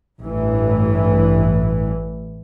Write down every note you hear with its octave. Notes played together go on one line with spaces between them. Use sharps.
A1 G2 E3